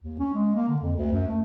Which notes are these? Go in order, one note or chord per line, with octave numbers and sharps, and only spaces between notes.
D#2
C#4
G#3
A#3
D3
F2
D2
F#2
A3